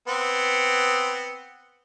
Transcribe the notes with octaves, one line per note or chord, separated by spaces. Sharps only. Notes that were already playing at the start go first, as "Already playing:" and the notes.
B3 C4